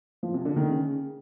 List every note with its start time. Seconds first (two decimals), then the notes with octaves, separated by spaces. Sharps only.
0.23 F3
0.34 C3
0.45 D3
0.56 D#3
0.68 C#3